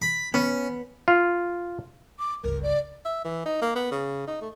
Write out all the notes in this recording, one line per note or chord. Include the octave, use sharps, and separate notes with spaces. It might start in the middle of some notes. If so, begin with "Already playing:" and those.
B5
B3 C#4
F4
D6
G1 C#2 A#4
D5
E5
E3
D#4
A#3
B3
C#3
D#4
A3